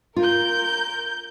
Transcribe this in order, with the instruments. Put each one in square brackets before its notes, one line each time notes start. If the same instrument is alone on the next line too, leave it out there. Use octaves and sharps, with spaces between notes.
[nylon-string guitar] F4 [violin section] A#4 G6